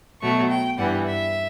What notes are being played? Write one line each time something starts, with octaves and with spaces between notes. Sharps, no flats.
B2 F#3 A3 C#6
G5
G2 E3 G3 F#5
E5